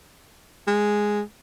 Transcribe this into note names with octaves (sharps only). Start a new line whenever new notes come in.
G#3